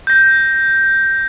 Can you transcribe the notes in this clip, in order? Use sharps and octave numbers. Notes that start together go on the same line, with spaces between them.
G6 A#6